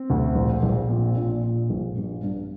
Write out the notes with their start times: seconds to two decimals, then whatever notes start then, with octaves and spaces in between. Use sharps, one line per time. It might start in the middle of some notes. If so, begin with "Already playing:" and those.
Already playing: C4
0.10 D2
0.35 A#1
0.62 A#1
0.89 A#2
1.16 A#2 D4
1.43 A#2
1.70 A#1
1.97 G2
2.23 G2